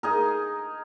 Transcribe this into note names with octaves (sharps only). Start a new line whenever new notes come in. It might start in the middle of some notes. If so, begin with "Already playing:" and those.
D#4 G#4 A#4